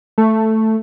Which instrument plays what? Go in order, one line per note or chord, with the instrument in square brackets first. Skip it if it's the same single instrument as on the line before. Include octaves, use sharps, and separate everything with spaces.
[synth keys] A3